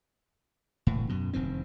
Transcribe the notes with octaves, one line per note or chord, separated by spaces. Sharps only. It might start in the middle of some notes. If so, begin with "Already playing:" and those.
E1 A2
F#2 B2
F1 G2 D#3 C4